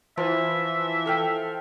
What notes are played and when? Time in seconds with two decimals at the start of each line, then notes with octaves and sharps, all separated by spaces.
0.17 E3 F3 E5
1.06 A4 F5 G5